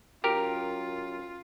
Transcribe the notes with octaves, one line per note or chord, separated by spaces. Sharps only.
F#2 F4 G4 A#4